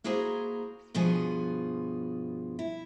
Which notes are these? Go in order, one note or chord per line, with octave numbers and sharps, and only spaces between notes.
A#3 E4 F#4 G#4 C5 A#5
G2 B2 F3 G#4
E4